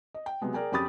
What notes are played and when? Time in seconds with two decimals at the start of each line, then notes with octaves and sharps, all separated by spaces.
0.14 D#5
0.26 G5
0.42 C3 F#3 G#3 B3
0.54 G#4 A#4 D5 G5 G#5
0.72 F2 C#4 G4 B5 D#6 A6